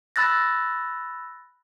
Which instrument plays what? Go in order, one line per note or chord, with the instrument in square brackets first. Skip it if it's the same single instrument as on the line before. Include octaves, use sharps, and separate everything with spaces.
[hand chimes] B5 E6 F#6 A6 A#6